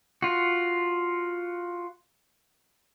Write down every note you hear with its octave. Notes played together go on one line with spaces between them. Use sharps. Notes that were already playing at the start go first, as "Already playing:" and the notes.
F4 F#4